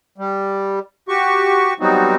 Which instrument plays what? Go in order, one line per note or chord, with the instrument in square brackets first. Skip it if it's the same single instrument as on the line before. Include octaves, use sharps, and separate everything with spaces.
[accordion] G3
F#4 G4 C#6
F#3 G3 B3 C4 D#4 F#4